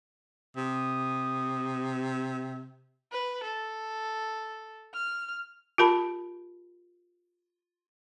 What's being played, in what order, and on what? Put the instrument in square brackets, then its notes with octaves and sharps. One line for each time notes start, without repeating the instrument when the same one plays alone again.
[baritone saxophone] C3 [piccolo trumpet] D#6
[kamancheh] B4
A4
F6
[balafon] F4 G4 A#4 A5 B5